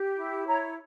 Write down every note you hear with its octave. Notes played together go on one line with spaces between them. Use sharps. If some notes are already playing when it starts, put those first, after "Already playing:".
Already playing: G4
E4
C#5 A#5